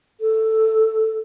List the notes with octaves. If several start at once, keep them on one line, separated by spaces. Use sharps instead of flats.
A4